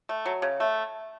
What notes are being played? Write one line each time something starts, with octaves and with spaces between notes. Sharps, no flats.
A3
F#3
C#3
A3